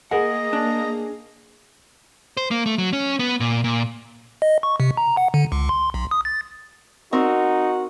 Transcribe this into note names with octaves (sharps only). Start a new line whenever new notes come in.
A#3 G#4 A#4 D#5 F#5 A#5
D4
C5
A#3
A3
F#3
C#4
B3
A#2
A#2
D#5
C#6
C3
A#5
F#5
D3
C#2
C6
B1
D#6
A6
C4 D#4 F#4 A#4